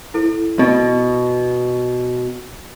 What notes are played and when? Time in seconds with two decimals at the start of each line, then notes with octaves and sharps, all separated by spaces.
0.14 E4 A4
0.59 B2